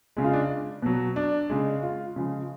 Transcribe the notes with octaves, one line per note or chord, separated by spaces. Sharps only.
C#3 G#3
F4
D4
B2 F#3
D4
C#3 G#3
F4
C#3 F3 G#3